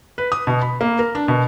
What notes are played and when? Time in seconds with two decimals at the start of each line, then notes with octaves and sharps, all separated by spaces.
0.18 B4
0.32 D#6
0.47 B2
0.61 B5
0.81 A#3
0.99 A#4
1.15 D4
1.28 B2